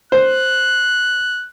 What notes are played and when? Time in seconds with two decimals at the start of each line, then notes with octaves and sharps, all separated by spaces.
0.12 C5 F#6